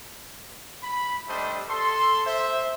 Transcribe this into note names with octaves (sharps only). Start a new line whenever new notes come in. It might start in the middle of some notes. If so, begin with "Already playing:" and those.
B5
G3 A3 D4 C5 D#5
A4 C6
C5 E5